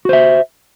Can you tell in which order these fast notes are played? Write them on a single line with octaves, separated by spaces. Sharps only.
F#4 C5 E5